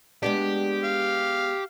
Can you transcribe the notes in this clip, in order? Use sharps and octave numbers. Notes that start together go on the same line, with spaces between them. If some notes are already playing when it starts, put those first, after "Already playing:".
G#3 B3 D4 G4
F5